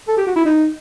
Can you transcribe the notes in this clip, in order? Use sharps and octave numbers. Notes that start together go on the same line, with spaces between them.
A4
G4
F#4
E4
D#4